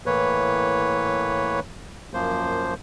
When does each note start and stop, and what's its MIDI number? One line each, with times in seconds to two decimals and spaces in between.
0.06 1.60 45
0.06 1.60 52
0.06 1.60 58
0.06 1.60 71
0.06 1.60 73
2.14 2.74 42
2.14 2.74 53
2.14 2.74 58
2.14 2.74 72